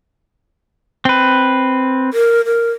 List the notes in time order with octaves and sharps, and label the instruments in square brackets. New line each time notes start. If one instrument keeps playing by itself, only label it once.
[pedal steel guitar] C4 B4
[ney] A#4
A#4